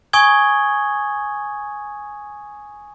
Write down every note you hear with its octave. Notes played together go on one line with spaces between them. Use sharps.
G#5 C#6 D#6 G#6 G7